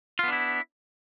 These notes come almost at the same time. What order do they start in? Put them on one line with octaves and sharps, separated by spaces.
F4 B3 D4 E4